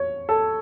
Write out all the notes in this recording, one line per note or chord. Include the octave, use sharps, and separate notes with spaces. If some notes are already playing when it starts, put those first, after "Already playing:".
Already playing: C#5
A4